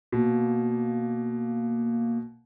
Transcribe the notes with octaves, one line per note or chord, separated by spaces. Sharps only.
B2 A#3